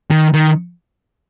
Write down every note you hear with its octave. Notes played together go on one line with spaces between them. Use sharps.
D#3
D#3